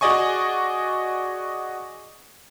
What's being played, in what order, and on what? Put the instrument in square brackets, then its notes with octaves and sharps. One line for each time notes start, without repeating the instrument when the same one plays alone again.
[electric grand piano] F#4 G#4 D5 D#5 G#5 C#6